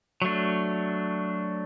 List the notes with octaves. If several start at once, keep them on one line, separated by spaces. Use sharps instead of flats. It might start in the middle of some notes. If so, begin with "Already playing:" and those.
F#3 A3 D4